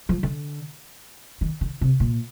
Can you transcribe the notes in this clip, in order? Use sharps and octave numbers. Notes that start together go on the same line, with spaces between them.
F3
D3
D#3
D3
C3
A#2